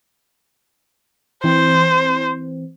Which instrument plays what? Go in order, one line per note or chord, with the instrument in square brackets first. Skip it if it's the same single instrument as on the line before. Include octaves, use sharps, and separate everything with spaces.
[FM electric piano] E3 C4 [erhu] C5